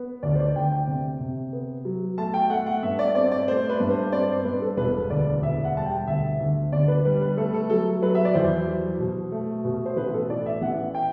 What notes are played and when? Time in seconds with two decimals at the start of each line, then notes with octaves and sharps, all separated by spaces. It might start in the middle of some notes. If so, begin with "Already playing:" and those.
Already playing: B3
0.23 D2 D5
0.35 C5
0.39 D5
0.55 D2 G5
0.72 G5
0.88 C3
1.20 C3
1.53 B3
1.85 F#3
2.18 A3 A5
2.34 G5
2.50 A3 F#5
2.66 F#5
2.83 G2 E5
2.99 D5
3.15 C4 D5
3.32 D5
3.48 A3 C5
3.69 B4
3.80 G2
3.90 C5
4.12 C4 D5
4.29 C5
4.45 G2 B4
4.62 A4
4.77 E1 B4
5.10 D2 D5
5.42 E1 E5
5.64 F#5
5.75 G3 A5
5.86 G5
6.07 D2 E5
6.40 D2
6.72 D3 D5
6.88 B4
7.05 G3 B4
7.21 B4
7.37 A3 A4
7.54 A4
7.70 F#3 A4
8.02 F#3 B4
8.15 E5
8.25 D5
8.34 E2 C5
8.67 F#3
9.00 B2
9.32 A3
9.65 B2
9.86 C5
9.97 A1 B4
10.14 A4
10.29 A2 D5
10.46 E5
10.62 A1 F#5
10.94 G5